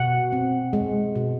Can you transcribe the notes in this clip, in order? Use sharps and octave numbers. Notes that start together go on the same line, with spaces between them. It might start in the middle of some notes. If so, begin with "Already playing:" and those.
Already playing: B2 F#5
C4
G#3
B2